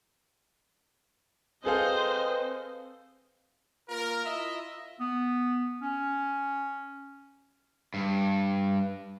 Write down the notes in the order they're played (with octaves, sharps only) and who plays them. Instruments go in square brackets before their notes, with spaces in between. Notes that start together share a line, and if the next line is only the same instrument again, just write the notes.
[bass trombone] C4 [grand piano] G#4 A4 F5 [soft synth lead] B4 [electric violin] C5 D#5
[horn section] A#3 F4 A#4
E4 F4 D#5 E5
[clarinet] B3
C#4
[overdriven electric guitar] G2